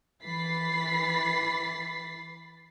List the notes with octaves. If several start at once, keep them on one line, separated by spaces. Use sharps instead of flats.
E3 B5 A6 B6 C7